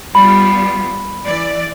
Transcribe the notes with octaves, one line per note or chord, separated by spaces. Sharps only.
G3 B3 F4 B5
E3 D5